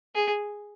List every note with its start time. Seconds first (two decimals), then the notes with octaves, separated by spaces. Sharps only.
0.15 G#4